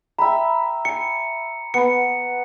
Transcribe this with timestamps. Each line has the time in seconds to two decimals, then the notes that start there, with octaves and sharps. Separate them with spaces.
0.19 E5 G5 A#5 B5
0.85 G#5 C#7
1.74 B3 C#7